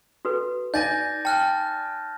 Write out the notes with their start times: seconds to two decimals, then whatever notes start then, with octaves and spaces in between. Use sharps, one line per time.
0.25 F#4 A4 B4
0.74 D#4 D5 G#5 G6 A6 A#6
1.25 G5 A5 F6 F#6